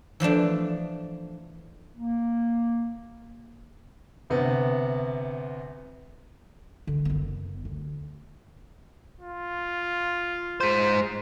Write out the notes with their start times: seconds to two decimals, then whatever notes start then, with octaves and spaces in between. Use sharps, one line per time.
0.20 E3 F3 A3 D4
1.95 A#3
4.30 D2 C3 B3
6.87 D3
7.05 F#1 B3
7.65 D2
9.21 F4
10.61 G#3 C5